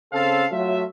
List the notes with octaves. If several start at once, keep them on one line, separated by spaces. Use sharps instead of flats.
C#3 C4 A4 F5
F#3 A3 F4 E5